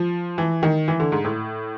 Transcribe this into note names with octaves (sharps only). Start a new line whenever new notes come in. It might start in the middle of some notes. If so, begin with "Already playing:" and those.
Already playing: F3
E3
D#3
E3
D3
G#2
A2